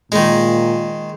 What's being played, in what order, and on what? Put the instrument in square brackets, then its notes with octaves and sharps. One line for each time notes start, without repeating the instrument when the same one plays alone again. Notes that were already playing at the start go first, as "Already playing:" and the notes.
[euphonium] A#2 [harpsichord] D#3 G#3